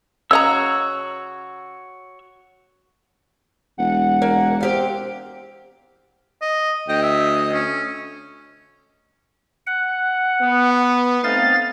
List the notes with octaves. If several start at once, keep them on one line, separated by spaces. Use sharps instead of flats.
C#3 F#4 C#5 D#5 A#5 E6
E1 F#5
A#3
C4 G4 F5
D#5
D2 D#5 G5
E5
C#4
F#5
B3
A3 C4 D#4 F5 A6